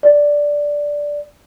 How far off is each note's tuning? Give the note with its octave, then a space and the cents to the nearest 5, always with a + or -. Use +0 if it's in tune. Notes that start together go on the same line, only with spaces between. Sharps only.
D5 -5